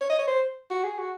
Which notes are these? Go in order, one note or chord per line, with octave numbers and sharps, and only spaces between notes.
C#5
D#5
C#5
C5
F#4
G#4
F#4